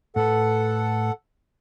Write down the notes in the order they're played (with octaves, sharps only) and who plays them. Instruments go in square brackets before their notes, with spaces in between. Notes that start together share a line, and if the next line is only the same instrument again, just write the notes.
[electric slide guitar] A2 B4 [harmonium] A4 F#5